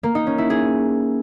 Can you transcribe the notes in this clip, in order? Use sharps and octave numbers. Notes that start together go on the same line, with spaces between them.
A#3
D#4
C#4
E4
G#4